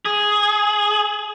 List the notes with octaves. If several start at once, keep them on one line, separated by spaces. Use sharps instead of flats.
G#4